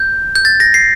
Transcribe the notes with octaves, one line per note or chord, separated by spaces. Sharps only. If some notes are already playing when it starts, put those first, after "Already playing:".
Already playing: G6
G6
A6
A#6
C7